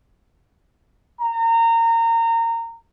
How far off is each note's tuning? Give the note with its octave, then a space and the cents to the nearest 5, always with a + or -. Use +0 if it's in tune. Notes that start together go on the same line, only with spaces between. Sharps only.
A#5 -25